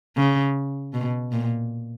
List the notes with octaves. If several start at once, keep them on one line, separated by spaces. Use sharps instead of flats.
C#3
B2
A#2